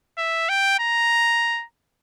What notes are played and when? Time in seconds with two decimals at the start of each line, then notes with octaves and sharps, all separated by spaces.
0.18 E5
0.49 G5
0.80 A#5